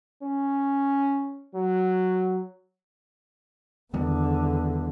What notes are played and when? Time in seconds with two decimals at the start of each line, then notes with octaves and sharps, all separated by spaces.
0.23 C#4
1.55 F#3
3.94 E2 D3 D#3 G3 B3